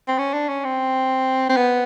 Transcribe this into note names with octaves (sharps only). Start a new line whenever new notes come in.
C4
C#4
D4
C#4
C4
C4
B3